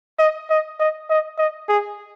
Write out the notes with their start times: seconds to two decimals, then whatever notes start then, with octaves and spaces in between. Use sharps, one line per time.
0.19 D#5
0.50 D#5
0.80 D#5
1.10 D#5
1.38 D#5
1.69 G#4